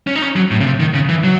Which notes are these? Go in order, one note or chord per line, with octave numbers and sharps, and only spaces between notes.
C#4
D#4
C#4
F#3
A2
C#3
C3
D#3
C#3
E3
F#3